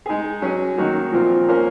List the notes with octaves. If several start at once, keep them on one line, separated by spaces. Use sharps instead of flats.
G#3 D#4 G#4
F#3 C#4 G#4
D#3 F#3 A#3 D#4 F#4
A#2 F3 C4 F4 A#4
A#3 C#4 F4 A#4